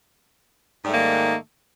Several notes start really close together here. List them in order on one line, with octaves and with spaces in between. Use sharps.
G#2 G3 A3 A#3 D#3